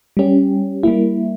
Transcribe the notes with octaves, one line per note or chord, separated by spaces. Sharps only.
G3 C#4 G4
G3 A#3 E4